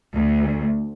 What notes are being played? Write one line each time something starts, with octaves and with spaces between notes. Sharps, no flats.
D2